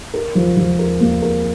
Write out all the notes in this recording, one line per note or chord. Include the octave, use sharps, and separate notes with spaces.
A#4
F3
F3
A#4
A#3
A#4